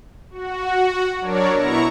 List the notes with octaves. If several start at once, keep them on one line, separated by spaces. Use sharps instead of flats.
F#4
F#3 D4 A#4 C#5 D5
B2 E4 A#5 C#6